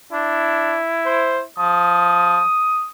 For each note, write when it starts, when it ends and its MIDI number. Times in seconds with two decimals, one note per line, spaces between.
0.12 0.77 62
0.12 1.49 64
1.06 1.38 72
1.58 2.41 53
1.58 2.89 87